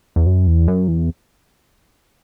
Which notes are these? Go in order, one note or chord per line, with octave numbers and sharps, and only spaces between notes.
E2
F#2
E2
F#2
E2